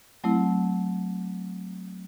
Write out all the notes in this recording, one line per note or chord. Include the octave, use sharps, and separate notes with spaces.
F#3 A3 C4 E4